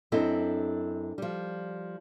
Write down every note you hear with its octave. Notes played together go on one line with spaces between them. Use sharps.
F#2 C4 D4 E4 A4 D#5
F3 G3